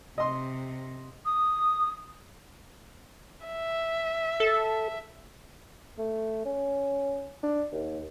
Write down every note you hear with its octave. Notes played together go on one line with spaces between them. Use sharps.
C3 D#5 C6
D#6
E5
A4
A3
C#4
D4
D#2